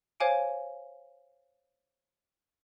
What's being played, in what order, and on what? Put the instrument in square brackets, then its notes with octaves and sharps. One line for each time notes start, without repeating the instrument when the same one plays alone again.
[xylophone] C5 C#5 F5 G#5 D6 D7